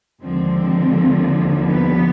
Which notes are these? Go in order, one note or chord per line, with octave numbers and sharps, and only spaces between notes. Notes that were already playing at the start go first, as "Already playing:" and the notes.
D#2 D3 F3 G#3 C4
G3 B3